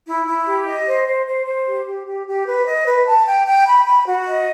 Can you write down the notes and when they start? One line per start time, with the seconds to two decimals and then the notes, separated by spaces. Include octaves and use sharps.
0.07 E4
0.27 E4
0.47 G4
0.67 D#5
0.87 C5
1.07 C5
1.26 C5
1.47 C5
1.67 G4
1.86 G4
2.06 G4
2.26 G4
2.47 B4
2.66 D#5
2.87 B4
3.07 A5
3.27 G5
3.47 G5
3.66 B5
3.86 B5
4.06 F#4
4.26 D#5